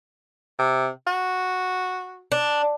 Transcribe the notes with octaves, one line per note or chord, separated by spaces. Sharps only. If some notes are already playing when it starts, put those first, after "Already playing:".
C3
F#4
D4